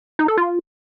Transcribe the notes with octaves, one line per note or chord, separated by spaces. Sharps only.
D#4
A4
F4